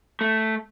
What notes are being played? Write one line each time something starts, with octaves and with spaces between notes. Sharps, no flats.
A3